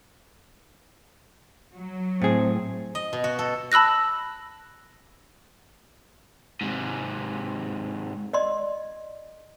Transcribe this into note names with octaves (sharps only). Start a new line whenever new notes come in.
F#3
A2 C4 G#4
D#5
B2
F#4
A4
A5 B5 E6 F#6 A#6
G#2 C3
D5 D#5 C6